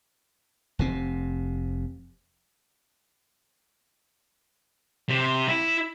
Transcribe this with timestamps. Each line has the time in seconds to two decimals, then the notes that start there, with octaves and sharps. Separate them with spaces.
0.79 F1 C3 C4
5.09 C3
5.48 E4